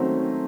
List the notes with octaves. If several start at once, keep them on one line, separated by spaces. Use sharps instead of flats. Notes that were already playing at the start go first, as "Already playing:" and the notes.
Already playing: D#3 F#3 A3 C4 C#4